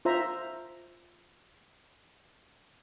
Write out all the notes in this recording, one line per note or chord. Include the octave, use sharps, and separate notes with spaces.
F4 C5 E5 A#5